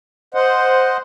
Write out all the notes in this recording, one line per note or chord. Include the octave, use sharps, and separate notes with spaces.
C5 D#5 F#5